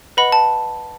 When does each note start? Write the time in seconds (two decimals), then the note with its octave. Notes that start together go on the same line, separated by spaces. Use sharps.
0.17 B4 D#5 F#5 B5
0.32 A5